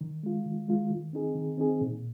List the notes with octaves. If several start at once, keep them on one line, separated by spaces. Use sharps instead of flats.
D#3
G#3 F4
D#3
G#3 F4
D#3
C4 D#4 G#4
D#3
C4 D#4 G#4
A#2